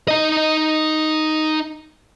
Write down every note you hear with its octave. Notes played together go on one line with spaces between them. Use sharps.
D#4 D#5